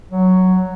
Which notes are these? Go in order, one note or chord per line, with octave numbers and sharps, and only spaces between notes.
F#3